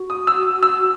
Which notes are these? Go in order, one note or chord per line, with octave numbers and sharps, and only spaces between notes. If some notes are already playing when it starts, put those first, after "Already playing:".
Already playing: F#4
D#6
E6
E6